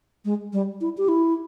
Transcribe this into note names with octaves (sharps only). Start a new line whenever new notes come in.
G#3
G3
E4
G4
E4